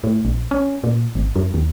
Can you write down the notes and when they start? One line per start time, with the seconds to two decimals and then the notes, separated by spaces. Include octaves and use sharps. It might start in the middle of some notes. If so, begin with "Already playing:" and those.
0.04 A2
0.25 A#1
0.51 C#4
0.84 A#2
1.15 G#1
1.36 F#2
1.54 D#2